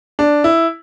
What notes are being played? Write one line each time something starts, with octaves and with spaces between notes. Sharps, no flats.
D4
E4